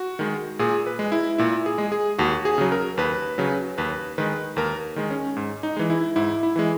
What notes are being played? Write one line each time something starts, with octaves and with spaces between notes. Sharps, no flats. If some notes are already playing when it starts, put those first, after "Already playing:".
Already playing: F#4
D#3 G#3
A#2 G#4
B4
G#3
E4
A#2 E4
G#4
G#3
G#4
D#2 F#4
G#4
C#3 F#3
A#4
D#2 B4
C#3 F#3
D#2 B4
D#3 G#3 B4
D#2 A#4
D#3 G#3
C#4
G#2
D#4
E3 G#3
E4
G#2 E4
E4
E3 G#3